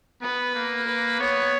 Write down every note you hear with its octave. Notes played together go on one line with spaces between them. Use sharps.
B3 B4
A#3
B4
B3 C#5